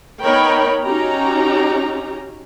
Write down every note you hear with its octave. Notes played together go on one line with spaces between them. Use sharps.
B3 D#4 A#4 C#5 G5 B5
C#4 D#4 F#4 G4 A#5